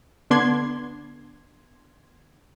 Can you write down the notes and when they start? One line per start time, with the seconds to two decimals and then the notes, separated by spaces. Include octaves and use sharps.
0.30 D3 B3 D4 C6 G#6